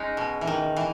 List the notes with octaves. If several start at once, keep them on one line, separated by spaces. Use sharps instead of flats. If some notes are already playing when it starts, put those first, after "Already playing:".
Already playing: G#3 C#4 D#4
B2
E3
D#3
E3